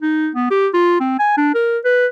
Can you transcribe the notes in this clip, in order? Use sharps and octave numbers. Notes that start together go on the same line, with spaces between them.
D#4
B3
G4
F4
C4
G#5
D4
A#4
B4